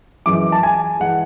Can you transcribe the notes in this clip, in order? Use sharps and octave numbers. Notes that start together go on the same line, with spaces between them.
F#2 E3 G#3 D6
A5
G#5
E3 G#3 F#5